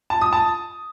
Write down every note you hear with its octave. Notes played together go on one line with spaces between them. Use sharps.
A5
D#6
A5